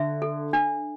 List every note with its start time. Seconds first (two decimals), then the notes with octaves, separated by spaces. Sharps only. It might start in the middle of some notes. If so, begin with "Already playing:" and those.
Already playing: D3 E5
0.22 A4
0.53 D4